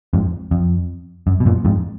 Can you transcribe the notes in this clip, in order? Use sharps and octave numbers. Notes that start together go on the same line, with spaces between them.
F2 G#2
F2
F#2
B2
F#2 A#2
F2 G#2